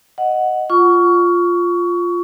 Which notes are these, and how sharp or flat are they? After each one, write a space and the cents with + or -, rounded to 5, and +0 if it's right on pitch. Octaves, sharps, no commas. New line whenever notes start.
D#5 -5 F#5 +0
F4 +0 C#6 +20